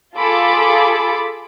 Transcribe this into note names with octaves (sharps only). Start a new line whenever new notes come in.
F4 G#4 A4 B5 D6